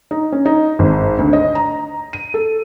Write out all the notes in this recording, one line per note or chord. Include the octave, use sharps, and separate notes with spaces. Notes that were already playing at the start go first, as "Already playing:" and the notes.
D#4
C#4
D#4
G#1
D2
D#5
A#5
D#7
A4